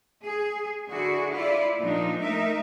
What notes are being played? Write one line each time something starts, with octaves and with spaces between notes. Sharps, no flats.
G#4
D3 E4 F#4 G#4
E4 F4 D5
A#2 F3 D4 D#4
A3 D#4 A#4 E5